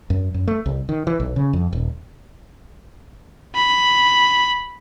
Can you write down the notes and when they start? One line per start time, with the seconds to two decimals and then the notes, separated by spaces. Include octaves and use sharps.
0.10 F#2
0.34 F#2
0.48 A3
0.66 C2
0.89 D#3
1.07 E3
1.20 B1
1.36 C#3
1.53 F2
1.73 D#1
3.56 B5